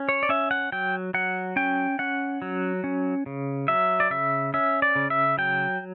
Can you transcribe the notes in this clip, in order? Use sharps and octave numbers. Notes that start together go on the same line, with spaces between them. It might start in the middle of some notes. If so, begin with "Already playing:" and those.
Already playing: C#4
C#5
D5
C#4 E5
F#5
F#3 G5
F#3 F#5
C#4 G5
C#4 F#5
F#3
C#4
C#3
F#3 E5
D5
C#3 E5
C#4 E5
D5
C#3
E5
F#3 G5